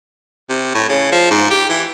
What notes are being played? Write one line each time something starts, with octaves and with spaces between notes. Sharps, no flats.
C3
A2
C#3
F3
G#2
G4
E3